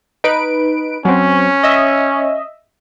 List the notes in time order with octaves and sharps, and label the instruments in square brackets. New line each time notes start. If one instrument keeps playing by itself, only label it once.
[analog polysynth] D#4 B4 D7
[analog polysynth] F#3 C4 [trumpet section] C#4
[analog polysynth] D#5 E5